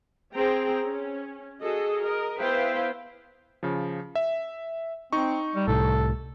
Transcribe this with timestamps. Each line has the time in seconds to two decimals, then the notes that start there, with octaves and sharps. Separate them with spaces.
0.34 C4 G#4 C5 G5 A#5
0.83 C#4
1.62 F#4 G#4 A4 D#5
2.02 A#4 D#5
2.40 B3 E4 B4 C5 F5 G5
3.63 C#3 F3
4.15 E5
5.13 C4 D#4 C#6
5.55 G3
5.68 C2 A2 A4